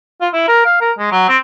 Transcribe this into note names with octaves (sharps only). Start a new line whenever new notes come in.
F4
E4
A#4
F5
A#4
G#3
F#3
C4